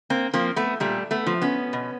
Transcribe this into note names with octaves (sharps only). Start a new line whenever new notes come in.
A#3 C4
F3 A#3 C4
A3 B3
A#2 G3 A3
A3 B3
F3
B3 C#4
B2